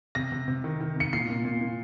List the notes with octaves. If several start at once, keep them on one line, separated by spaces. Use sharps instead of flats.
C3 A#6
C3
C3
D#3
D#3
C3 C#7
A#2 C7
A#2
A#2
A#2